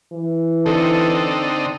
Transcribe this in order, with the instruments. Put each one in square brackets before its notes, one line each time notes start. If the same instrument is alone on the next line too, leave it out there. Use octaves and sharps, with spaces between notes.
[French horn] E3
[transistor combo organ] D3 C4 D#4 [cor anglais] A4